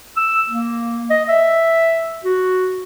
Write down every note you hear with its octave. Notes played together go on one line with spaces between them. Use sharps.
E6
A#3
D#5
E5
F#4